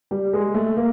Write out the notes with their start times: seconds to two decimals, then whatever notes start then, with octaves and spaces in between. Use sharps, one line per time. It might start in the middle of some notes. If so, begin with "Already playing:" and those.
0.11 G3
0.33 G#3
0.54 A3
0.77 A#3